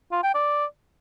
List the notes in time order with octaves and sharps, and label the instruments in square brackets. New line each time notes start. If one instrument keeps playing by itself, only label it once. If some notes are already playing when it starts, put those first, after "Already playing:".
[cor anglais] F4
G5
D5